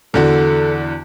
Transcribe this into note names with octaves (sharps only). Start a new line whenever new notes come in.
E2 D3 F#4 A4